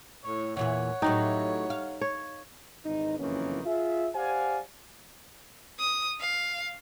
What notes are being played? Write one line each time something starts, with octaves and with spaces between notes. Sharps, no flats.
A2 C#5
E2 A#2 E3 C#5 F#5
A2 F#3 D#4 G4
F5
C#5
G#1 E2 D#4
F#1 F2 D#3 E3 A#3 C#4
F4 G#4 E5
G4 C5 D5 F5 F#5 G#5
D#6
F5